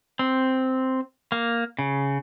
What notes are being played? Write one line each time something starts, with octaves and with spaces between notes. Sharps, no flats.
C4
A#3
C#3